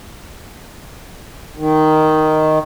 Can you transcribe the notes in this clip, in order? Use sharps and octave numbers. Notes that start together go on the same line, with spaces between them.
D#3